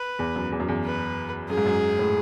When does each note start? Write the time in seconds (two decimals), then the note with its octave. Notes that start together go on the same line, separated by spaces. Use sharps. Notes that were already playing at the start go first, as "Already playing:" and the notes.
Already playing: B4
0.19 E2
0.36 F#2
0.52 E2
0.60 F#2
0.68 E2
0.85 B4
1.50 F#2 G#4
1.58 G#2
1.66 F#2
1.99 A2